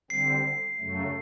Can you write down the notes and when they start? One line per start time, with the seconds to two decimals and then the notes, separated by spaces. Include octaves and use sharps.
0.10 D3 G3 C4 C7
0.79 F#2 C#3 F#3 A3